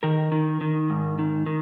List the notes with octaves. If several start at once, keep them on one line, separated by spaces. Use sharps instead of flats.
D#3 A#4
D#3
D#3
G#2
D#3
D#3